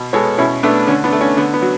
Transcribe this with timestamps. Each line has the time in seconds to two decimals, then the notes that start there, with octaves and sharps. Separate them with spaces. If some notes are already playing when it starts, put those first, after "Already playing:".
Already playing: B2
0.13 G#3 B3 A4 C#5
0.38 B2 C#4 E4
0.63 A3 B3 D4
0.87 D3 C#4
1.04 B3 D4
1.12 A3
1.21 C#4
1.37 D3 B3
1.54 B3
1.62 F#3